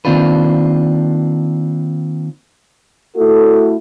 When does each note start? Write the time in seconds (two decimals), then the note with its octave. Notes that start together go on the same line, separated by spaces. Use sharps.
0.05 D#3 A#3 C4 D4 F4 B4
3.16 A3 E4 F#4 A4